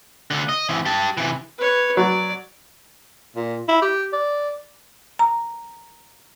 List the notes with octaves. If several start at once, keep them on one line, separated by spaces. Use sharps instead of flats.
D2 D3
D#5
E3 C4
G4 A5
C3 E3
B4 C#5
F#3 D5
A#2
E4
G4
D5
A#5